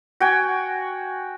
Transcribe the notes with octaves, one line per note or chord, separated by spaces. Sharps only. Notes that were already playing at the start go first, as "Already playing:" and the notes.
F#4 G5 G#5